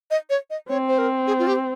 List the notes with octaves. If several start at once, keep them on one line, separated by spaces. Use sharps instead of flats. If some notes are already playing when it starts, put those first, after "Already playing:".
D#5
C#5
D#5
C4 C#5
C5
A#4
G#4
F4
G4